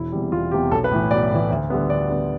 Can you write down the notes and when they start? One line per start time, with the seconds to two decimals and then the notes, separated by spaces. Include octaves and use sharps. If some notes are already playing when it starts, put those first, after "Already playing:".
Already playing: E1 E4
0.12 E2 C3 G3
0.32 E1 F4
0.51 E2 C3 G3 G4
0.71 B1 A4
0.84 B4
0.91 A2 E3
1.11 B1 D5
1.30 A2 E3
1.50 D2
1.70 D3 G3 B3
1.90 D2 D5
2.09 D3 G3 B3